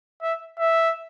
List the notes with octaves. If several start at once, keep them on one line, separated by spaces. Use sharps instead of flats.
E5
E5